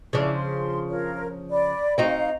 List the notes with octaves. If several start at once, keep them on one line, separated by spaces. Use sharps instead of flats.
C#3 F3 D4 E4 D6
C6
F4 A#4 C#5
D5 B5
C4 D#4 F#4 F5